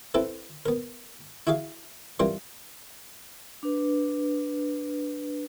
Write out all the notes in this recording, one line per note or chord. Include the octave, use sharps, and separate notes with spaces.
C4 E4 A4 B4
B3 A#4
E4 F#4 G#4 E5 F5
E3 G3 C4 F4 A#4 C5
D4 B4